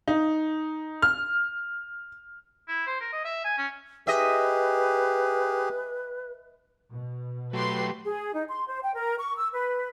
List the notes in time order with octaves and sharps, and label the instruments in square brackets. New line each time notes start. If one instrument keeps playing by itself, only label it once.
[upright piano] D#4
F6
[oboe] E4
C5
A#4
D#5
E5
G#5
C#4
[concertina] G4 G#4 [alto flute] B4 [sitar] D#5 E5
[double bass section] B2
[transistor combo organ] F#3 A3 [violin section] G4 B4 C6
[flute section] G#4
D#4
C6
C5
G5
A#4
C#6
E6
B4